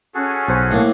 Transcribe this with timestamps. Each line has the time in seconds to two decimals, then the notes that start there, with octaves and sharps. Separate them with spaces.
0.15 C#4 F#4 G#4 A4 F#6
0.48 B1 C5
0.71 A2 A#3